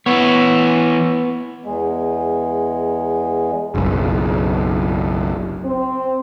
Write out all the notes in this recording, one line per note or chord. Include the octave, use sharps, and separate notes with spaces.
E3 B3 C#5
E2 G#3
F#1 B1
C4